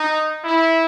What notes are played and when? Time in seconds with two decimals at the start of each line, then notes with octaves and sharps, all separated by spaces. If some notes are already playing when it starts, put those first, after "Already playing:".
Already playing: D#4
0.44 E4